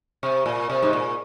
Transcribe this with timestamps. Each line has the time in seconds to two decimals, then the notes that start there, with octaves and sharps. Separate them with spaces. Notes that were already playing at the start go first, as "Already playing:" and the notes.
0.23 C3
0.46 A#2
0.70 C3
0.82 G#2
0.93 A#2